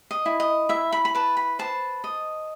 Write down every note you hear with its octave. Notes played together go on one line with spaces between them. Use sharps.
D#5
E4
D#5
E4 E5
B5
B5
B4 A5
B5
C5 A5
D#5